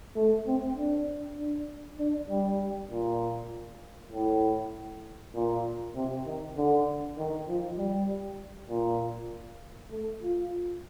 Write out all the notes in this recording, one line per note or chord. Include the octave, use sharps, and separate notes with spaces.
A3
C4
D4
D4
D4
G3
A#2
A2
A#2
C3
D#3
D3
D#3
F3
G3
A#2
A3
F4